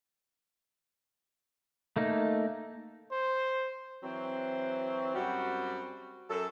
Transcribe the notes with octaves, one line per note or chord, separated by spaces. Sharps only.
A3 A#3 D#4
C5
E3 F#3 C4
F#2 G3 C4 F#4
F#2 A4